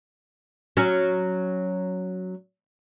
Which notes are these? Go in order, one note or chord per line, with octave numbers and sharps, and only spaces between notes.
F#3 C#4